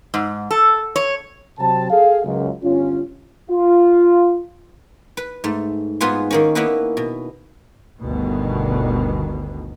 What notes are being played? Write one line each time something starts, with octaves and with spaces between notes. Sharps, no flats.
G#2
A4
C#5
C3 F#3 C4 A5
G#4 A4 F5
C#2 F#2
G1 C#4 F4
F4
B4
G#2 A3
G#2 B3 F4 G#4 B4 C6
D#3 A#3 C#4
A#3 B3 C#4 D#4 E4 B4
B2
G1 D2 B2 D#3